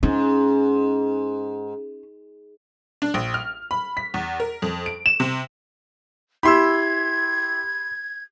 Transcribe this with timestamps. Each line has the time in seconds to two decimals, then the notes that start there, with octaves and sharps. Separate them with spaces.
0.03 G#2 C#4
3.02 D4
3.14 A#1
3.34 F6
3.71 B5
3.97 B6
4.14 E2
4.40 A#4
4.62 F2
4.86 D7
5.06 E7
5.20 C3
6.43 E4 G4 B5 C6 E6 G#6